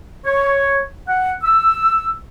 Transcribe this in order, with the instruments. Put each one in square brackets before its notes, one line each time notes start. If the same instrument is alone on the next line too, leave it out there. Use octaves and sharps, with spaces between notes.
[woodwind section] C#5
F#5
E6